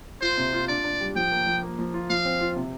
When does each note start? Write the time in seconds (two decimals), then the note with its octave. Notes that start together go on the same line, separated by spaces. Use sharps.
0.22 F4 C5
0.38 C3
0.53 F4
0.68 D4 D5
0.85 D4
1.00 G3
1.16 F3 G5
1.32 A#3
1.47 F3
1.63 A#3
1.79 F3
1.94 F4
2.10 F3 F5
2.25 C4
2.41 F4
2.56 C3